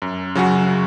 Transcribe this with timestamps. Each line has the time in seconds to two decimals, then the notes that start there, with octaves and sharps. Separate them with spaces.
0.02 F#2
0.35 C#3 F#3 C#4 F#4